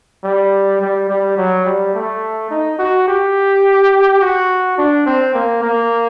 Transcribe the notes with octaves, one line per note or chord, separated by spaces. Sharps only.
G3
G3
G3
F#3
G3
A3
D#4
F#4
G4
F#4
D4
C4
A#3
A#3